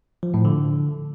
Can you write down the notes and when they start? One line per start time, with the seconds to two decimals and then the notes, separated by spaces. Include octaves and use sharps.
0.23 F3
0.34 A2
0.45 D3